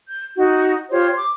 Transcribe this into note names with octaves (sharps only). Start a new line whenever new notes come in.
G6
D#4 F#4
F4 G4 C5 C#5
D6